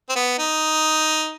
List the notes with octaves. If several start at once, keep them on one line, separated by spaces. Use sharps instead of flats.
C4
B3
D#4